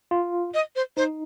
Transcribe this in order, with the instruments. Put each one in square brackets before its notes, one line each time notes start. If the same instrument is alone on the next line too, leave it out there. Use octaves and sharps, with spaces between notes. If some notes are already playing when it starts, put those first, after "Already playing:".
[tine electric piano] F4
[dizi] D#5
C5
[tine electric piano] D#4 [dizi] C5